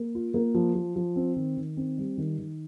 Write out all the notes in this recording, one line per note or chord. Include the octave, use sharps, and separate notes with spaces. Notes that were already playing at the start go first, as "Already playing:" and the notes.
Already playing: A#3
F4
A#3
F3
F3
F3
C4
D#3
D#3
C4
G3
D#3
D#3